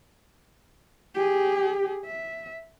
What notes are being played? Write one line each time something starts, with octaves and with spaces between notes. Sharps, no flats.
G4 G#4
E5